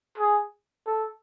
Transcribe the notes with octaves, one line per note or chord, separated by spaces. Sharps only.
G#4
A4